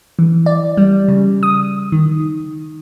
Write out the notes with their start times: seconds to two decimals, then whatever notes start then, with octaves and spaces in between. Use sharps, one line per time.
0.19 E3
0.46 D5
0.77 G3
1.08 C#3
1.43 D#6
1.92 D#3